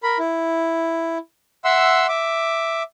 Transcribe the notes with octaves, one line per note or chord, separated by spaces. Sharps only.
A#4 B5
E4
E5 F#5 C6 E6
E5 D6